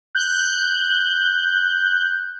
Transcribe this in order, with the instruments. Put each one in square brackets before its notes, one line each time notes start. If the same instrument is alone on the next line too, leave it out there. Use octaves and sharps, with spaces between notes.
[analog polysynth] F#6 G6